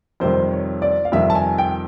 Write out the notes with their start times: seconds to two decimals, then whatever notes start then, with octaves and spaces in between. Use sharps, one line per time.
0.20 F2 C3 D#3 G3 C5
0.52 C#5
0.82 D5
1.05 F5
1.12 F2 C3 D#3 G3 E5
1.30 A5
1.35 G#5
1.58 G5